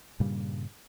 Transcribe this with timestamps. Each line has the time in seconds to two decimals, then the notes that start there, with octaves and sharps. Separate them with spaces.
0.20 G2 A#2 C#3 G3